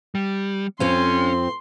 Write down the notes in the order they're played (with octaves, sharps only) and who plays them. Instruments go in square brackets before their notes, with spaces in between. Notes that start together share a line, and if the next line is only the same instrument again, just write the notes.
[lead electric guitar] G3
[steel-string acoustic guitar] F2 C4 F4 [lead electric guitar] C#4 [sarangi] C6